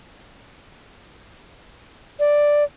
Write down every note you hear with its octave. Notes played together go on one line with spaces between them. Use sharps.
D5